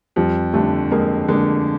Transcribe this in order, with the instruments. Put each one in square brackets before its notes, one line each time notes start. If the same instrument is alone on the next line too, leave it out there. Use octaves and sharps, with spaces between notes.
[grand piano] F2 [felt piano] F3 G3
[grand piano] D3 [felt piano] G3 A3
[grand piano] F2 [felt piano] G#3 A#3
[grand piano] D3 [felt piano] G#3 A#3